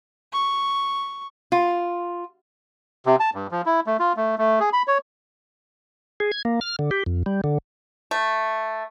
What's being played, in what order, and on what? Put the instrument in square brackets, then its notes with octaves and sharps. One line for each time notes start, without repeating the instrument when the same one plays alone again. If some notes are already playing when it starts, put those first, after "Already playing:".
[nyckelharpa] C#6
[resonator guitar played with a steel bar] F4
[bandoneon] C3
A5
G2
F3
E4
A3
F4
A3
A3
G#4
B5
C#5
[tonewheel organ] G#4
G#6
A#3
F6
D3
G4
F2
G3
D3
[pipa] A3